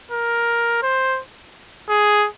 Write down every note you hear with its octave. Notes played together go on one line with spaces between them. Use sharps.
A#4
C5
G#4